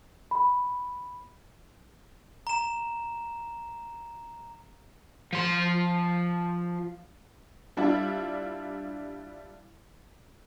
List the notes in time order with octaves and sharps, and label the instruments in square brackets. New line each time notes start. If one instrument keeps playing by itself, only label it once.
[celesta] B5
[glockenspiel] A#5 E7
[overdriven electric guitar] F3 C6
[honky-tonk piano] G3 D4 E4 F4